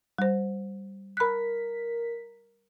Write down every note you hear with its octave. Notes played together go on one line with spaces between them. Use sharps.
G3 C5
A#4 B5 F#6 B6